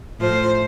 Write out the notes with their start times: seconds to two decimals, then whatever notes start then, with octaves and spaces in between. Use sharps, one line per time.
0.19 A2 F3 C5